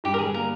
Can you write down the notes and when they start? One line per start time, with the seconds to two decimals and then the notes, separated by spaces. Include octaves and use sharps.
0.04 G2 G4
0.14 A#4
0.19 D3 G#4
0.34 A#3 A#4